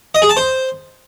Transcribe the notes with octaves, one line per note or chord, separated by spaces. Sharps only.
D#5
G#4
A5
C5